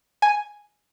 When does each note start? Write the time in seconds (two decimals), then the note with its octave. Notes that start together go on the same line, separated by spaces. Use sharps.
0.22 G#5